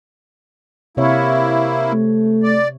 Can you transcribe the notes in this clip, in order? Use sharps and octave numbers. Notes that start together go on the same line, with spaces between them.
C3 A#3 E4 C#5 E5
A3
D5